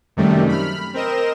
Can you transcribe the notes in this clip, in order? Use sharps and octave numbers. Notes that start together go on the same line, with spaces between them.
F#2 C3 D#3 G3 A3
B5 F6
C4 A#4 D#5 E7